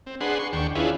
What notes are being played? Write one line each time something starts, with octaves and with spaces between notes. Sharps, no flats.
C4
D4 G#4 B4 F#5 C6
C6 C#6
D#2 D4 G5 C#6
C#4 D4 E4 F4 G#4 B4